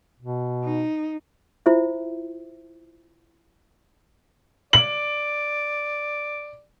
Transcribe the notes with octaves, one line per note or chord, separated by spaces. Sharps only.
B2
D#4
E4 F4 C5 E5
D5 F#7